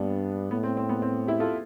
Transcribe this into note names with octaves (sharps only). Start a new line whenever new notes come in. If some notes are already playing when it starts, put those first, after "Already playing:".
Already playing: G2 B3 D4
A2 B3
C4
C4
B3
C4
E4 G4
F4 A4